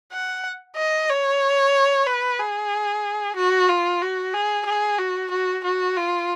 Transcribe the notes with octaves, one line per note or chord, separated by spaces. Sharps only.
F#5
D#5
C#5
B4
G#4
F#4
F4
F#4
G#4
G#4
F#4
F#4
F#4
F4